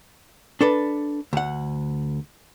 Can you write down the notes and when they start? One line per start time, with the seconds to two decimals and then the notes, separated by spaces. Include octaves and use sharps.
0.61 D4 A4 B4
1.33 D2 F#5